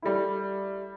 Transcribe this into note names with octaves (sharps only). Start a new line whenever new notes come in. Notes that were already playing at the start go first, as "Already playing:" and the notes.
G3 A3 E4